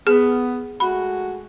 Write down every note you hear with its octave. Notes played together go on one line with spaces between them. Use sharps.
B3 G#4
G#3 A3 F#4 B5